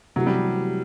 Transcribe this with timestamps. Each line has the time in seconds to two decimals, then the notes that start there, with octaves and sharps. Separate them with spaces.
0.16 C3 E3 F#3 A3 E4 G4
0.26 G3